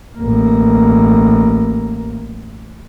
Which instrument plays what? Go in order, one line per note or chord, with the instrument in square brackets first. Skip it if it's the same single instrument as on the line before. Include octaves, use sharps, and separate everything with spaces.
[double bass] A1 A#3